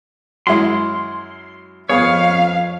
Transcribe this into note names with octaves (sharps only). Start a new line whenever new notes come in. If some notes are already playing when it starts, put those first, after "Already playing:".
F#2 G#3 E4 C6
F2 B3 G#4 C#5 F5